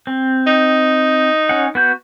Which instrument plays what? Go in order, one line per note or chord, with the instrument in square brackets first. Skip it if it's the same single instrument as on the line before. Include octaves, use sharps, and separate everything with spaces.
[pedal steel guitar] C4
[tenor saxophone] D#4
[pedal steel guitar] C#4 F#5
B3 F#4 G6